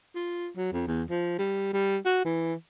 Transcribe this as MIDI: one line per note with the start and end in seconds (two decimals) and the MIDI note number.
0.15 0.49 65
0.57 0.71 54
0.73 0.83 41
0.87 1.03 40
1.10 1.37 53
1.39 1.70 55
1.73 1.97 55
2.05 2.21 66
2.25 2.54 52